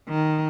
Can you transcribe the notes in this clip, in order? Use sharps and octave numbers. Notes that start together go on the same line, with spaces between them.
D#3